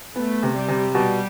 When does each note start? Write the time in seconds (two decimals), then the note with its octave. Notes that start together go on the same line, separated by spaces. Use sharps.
0.16 A3 B3
0.43 C3
0.55 G3
0.68 C3
0.95 B2 G3